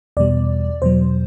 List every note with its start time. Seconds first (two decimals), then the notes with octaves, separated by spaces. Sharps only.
0.17 E2 B2 G3 D5
0.82 E2 B2 F#3 C5